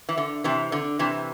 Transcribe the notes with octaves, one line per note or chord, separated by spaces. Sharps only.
E3
D3
C3 E3
D3
C3 E3